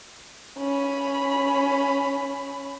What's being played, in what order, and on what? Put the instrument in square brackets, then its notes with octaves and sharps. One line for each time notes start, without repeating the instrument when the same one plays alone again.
[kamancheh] C#4 B5